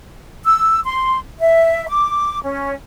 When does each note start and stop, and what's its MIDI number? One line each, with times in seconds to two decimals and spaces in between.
0.45 0.81 88
0.84 1.18 84
1.39 1.86 76
1.88 2.39 86
2.43 2.74 61